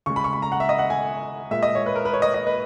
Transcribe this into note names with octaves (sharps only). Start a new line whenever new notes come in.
C#3 G#3 C#6
B5
C#6
B5
A#5
F#5
E5
D#5
F#5
G#5
A#2 G#3 E5
D#5
C#5
B4
A#4
B4
C#5
D#5
D#5
B4